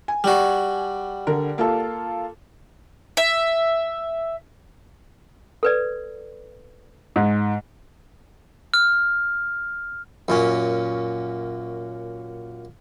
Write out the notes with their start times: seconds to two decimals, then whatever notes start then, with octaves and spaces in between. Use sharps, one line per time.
0.08 G#5
0.24 G3 F#4
1.27 D3 A#4
1.58 A#3 F4 A4
3.17 E5
5.63 A4 B4 D5
7.16 G#2
8.74 F6
10.28 F#2 A#2 C#4